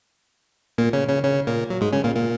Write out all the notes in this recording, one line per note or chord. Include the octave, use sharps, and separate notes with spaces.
A#2 A#3
C#3 C#4
C#3 C#4
C#3 C#4
A#2 A#3
F#3
G#2 G#3
C#3 C#4
A#2 A#3
A#2 A#3